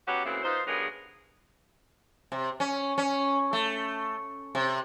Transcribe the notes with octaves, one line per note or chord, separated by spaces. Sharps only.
F#3 B3 C#4 F#4 G4
C#3 E3 F#3 A3 A#3 C4
D#4 F4 B4 C5
G2 F#3 G#3 B3 G#4 A#4
C3
C#4
C#4
A3
C3